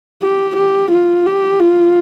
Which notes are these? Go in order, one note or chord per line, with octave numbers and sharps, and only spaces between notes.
G4
G4
F4
G4
F4